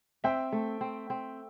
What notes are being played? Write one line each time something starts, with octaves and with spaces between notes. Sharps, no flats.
C4 E5 G5
A3
C4
C4